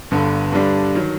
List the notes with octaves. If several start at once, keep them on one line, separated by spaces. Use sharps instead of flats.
G1 G2 D3
G2 D3 G3 D4
D#3 F#3